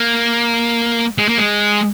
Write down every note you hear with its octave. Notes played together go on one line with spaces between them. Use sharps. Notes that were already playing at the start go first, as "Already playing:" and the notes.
Already playing: A#3
G#3
A#3
G#3